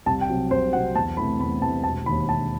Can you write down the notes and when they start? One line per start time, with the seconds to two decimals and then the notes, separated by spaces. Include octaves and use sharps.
0.06 C2 A5
0.21 G5
0.29 C3 F#3
0.51 C2 C5
0.73 C3 F#3 F#5
0.95 E2 A5
1.17 C3 E3 A3 B5
1.40 E2 B5
1.62 C3 E3 A3 A5
1.84 E1 A5
2.06 D#3 B5
2.10 D#2
2.29 E1 A5